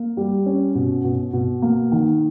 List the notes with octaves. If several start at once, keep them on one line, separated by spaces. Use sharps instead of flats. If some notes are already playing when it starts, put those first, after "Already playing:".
Already playing: A#3
G3
C#4
B2
B2
B2
A#3
D#3